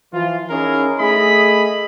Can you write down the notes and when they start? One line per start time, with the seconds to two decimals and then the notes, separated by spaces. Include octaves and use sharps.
0.13 E3 F3 F4
0.50 C#4 D#4 E4 G#4 A#4
1.00 A3 G#4 D#5 E5 B5